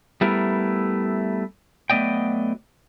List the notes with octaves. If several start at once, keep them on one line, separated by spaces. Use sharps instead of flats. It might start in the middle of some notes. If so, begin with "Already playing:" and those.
G3 A3 B3 E4 A#4
F#3 A3 B3 D5 D#5 G5